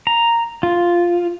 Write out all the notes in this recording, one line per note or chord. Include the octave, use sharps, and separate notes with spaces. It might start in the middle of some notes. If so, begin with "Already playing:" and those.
A#5
F4